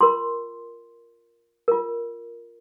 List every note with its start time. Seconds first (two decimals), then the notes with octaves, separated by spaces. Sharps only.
0.01 F4 A#4 C6
1.68 F4 A#4